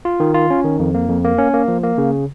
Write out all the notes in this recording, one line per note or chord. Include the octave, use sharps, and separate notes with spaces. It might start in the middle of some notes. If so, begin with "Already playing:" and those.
F4
D#3
F4
C#4
D#3
F2
A#3
F2
A#3
C#4
A#3
F3
A#3
C#3